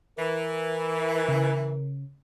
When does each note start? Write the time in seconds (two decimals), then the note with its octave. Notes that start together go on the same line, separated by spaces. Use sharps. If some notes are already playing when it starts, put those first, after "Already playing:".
0.19 E3 A#4
1.28 C#3